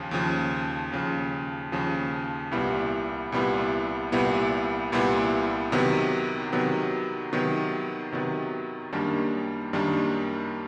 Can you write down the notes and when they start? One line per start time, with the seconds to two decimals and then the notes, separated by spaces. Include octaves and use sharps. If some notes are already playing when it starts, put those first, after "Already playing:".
Already playing: D#2 C#3 F3
0.11 D#2 C#3 F3
0.92 D#2 C#3 F3
1.72 D#2 C#3 F3
2.52 C2 A#2 G3 B3 E4
3.32 C2 A#2 G3 B3 E4
4.12 C2 A#2 G3 B3 E4
4.92 C2 A#2 G3 B3 E4
5.72 C3 D#3 F#3 B3
6.53 C3 D#3 F#3 B3
7.33 C3 D#3 F#3 B3
8.12 C3 D#3 F#3 B3
8.93 F#2 D#3 G3 A#3 D4
9.73 F#2 D#3 G3 A#3 D4